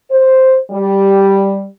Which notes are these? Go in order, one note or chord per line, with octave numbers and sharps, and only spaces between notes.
C5
G3